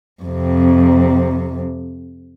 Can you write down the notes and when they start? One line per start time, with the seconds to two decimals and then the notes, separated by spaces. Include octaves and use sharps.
0.23 F2 C3